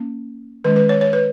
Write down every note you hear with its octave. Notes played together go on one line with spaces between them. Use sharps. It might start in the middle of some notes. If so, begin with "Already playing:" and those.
Already playing: A#3 C#4
D#3 G#3 C#4 B4
B4
C#5
C#5
B4